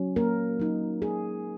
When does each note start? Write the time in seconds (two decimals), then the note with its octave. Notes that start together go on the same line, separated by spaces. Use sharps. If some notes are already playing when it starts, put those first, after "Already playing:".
Already playing: F#3 C#4
0.16 A#3 A#4
0.60 F#3 D#4
1.02 G#4